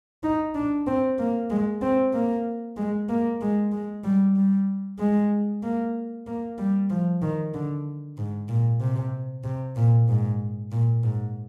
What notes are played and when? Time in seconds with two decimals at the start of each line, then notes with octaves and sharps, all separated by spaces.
0.23 D#4
0.55 D4
0.87 C4
1.19 A#3
1.50 G#3
1.82 C4
2.14 A#3
2.77 G#3
3.09 A#3
3.41 G#3
3.72 G#3
4.04 G3
4.36 G3
4.99 G#3
5.63 A#3
6.27 A#3
6.58 G3
6.90 F3
7.22 D#3
7.54 D3
8.18 G#2
8.49 A#2
8.81 C3
9.44 C3
9.76 A#2
10.09 G#2
10.72 A#2
11.04 G#2